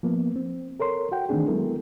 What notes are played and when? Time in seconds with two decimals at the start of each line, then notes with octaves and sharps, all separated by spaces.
0.03 F3 A#3 B3
0.36 C4
0.80 A4 A#4 C#5 C6
1.11 F#4 F#5 G5
1.29 D#3 E3 A3 C4 D4 G#4
1.48 F#3 G#3 B3 E4 A4 A#4